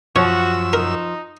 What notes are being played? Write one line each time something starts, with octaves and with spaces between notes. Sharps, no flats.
F#2 F3 F#4 C#5 E6
D#4 A#4